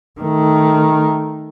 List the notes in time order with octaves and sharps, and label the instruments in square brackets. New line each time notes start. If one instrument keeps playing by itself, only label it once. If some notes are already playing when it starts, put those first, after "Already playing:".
[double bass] D#3 A3